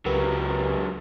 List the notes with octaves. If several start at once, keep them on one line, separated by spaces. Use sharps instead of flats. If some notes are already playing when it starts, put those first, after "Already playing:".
C#2 G#2 F#3 G4 A#4 B4